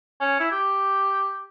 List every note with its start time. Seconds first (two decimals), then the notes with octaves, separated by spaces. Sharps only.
0.21 C#4
0.40 E4
0.51 G4